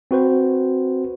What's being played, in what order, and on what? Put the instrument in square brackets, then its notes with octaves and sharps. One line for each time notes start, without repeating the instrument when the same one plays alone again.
[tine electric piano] C4 F#4 B4 C5